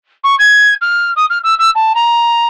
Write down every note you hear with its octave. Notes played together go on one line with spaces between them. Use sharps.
C#6
G#6
F6
D#6
F6
E6
E6
A5
A#5